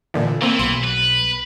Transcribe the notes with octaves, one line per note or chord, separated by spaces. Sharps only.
A#2 D3 E3
E3 A#3 C4
B1 C6
B4